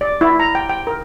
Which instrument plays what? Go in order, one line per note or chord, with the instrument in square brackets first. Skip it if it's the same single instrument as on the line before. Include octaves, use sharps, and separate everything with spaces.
[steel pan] D5
E4
A#5
G5
G5
A#4